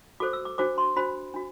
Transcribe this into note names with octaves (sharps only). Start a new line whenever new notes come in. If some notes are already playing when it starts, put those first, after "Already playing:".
F#4 A4 C5 D6
E6
D6
D4 F#4 C5 D6
C6
D4 F#4 C5 B5
D4 F#4